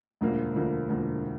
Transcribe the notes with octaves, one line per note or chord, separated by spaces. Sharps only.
E1 D2 D3 F3 A#3
E1 D2 D3 F3 A#3
E1 D2 D3 F3 A#3